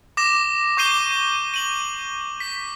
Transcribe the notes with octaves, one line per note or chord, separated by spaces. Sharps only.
D6 A#6 E7
C#6 D6 G6 C7 D#7 G7
D#7 F#7
B6